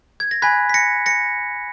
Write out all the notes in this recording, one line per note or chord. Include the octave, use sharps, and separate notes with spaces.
G#6
A#6
G#5 B5 F#6 G#6 B6
B6
A#6 C#7
A#6 C#7